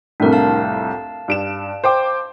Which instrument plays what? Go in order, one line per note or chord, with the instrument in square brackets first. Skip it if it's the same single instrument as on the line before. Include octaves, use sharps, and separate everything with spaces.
[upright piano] C2 F2 A2 [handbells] D4 A#4
[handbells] F5 A5
[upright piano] G2 D7 E7
C5 G5 D6